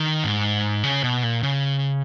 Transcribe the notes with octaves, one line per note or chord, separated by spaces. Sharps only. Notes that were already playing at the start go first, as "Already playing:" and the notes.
Already playing: D#3
G#2
C#3
B2
A#2
C#3